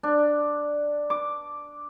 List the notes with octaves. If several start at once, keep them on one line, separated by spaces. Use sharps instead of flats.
D4
D6